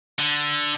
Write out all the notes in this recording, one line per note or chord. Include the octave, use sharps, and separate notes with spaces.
D3